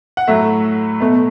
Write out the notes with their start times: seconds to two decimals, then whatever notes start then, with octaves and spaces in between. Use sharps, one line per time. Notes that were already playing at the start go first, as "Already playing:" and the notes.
0.17 F#5
0.28 A2 F#3 A3 E5
1.00 B2 A3